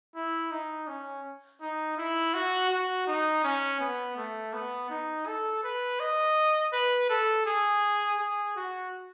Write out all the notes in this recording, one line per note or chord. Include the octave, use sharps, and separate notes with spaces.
E4
D#4
C#4
D#4
E4
F#4
F#4
D#4
C#4
B3
A3
B3
D#4
A4
B4
D#5
B4
A4
G#4
G#4
F#4